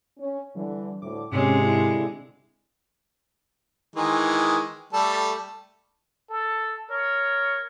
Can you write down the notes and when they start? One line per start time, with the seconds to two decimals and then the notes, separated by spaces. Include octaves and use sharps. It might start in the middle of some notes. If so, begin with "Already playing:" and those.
0.18 C#4
0.55 D3 E3 G3
1.02 D2 A2 D6
1.32 G#2 C3 G#3 C#4
1.61 D3 E4
3.96 D#3 E3 G#3
4.93 G3 A3 A4
6.29 A4
6.90 A#4 C#5